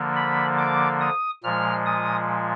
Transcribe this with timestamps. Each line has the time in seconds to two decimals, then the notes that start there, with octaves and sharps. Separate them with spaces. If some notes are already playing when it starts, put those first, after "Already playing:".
Already playing: D3 F3 A#3
0.16 B5
0.58 D6
1.01 D#6
1.43 A#2 F3 G#3 F6
1.86 D#6